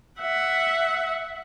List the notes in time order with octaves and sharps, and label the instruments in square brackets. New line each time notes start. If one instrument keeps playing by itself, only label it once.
[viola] E5 F#5